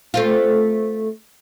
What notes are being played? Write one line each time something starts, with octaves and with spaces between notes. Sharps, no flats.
A3 C4 F4